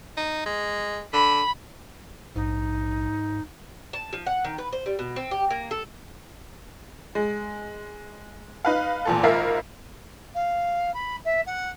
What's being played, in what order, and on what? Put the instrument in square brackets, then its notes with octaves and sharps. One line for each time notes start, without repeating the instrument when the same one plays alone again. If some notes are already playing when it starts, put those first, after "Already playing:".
[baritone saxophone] D#4
G#3
[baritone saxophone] D3 [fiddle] B5
[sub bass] A#1 [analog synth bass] G#2 [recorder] D#4
[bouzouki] A5
F3
F#5
D#3
B4
C5
G3
B2
C4
G4
A#3
A4
[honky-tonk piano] G#3
D#4 B4 F5
E2 A#2 A4
G#1 F4 A#4 E5 C7
[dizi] F5
B5
E5
F#5